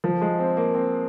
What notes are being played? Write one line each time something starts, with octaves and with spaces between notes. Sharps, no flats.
F3
G#3
C4
A#3
C4